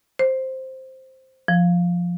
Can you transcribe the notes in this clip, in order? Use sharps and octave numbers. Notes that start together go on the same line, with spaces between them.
C5
F3